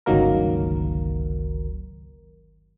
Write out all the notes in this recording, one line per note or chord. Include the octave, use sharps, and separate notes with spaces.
G1 C#2 D#3 F#3 A#3 A#4